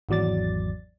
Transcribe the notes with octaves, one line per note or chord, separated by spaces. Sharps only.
G#1 E2 F#3 D5 A6